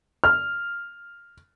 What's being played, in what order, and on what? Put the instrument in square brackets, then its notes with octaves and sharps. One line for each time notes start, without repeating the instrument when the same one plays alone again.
[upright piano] F6